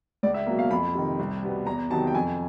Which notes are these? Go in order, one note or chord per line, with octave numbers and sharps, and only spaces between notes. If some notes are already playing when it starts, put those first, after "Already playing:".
C#2 D5
E5
B2 F#3 A#3
F5
F2 B5
C3 D#3
C2
B2 G3 B3
E2 A#5
C3 D#3 F#3 A5
G5
F2 G#5